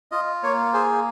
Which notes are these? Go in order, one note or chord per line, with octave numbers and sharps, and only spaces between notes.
F4 D#5
A#3 C#5
G#4 C5